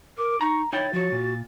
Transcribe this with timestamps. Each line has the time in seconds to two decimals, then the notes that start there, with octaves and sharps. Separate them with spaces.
0.17 A#4 D6
0.41 D#4 A#5 C#6
0.73 D#4 E4 C#5 G5 A6
0.93 F3 F#4 C#5
1.12 A#2